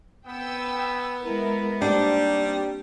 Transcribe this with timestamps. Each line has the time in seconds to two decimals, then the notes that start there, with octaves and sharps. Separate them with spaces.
0.27 B3 G5 E6
1.22 G#3 E4 A#4
1.82 G3 A#3 C4 D4 D#4 F#4 G4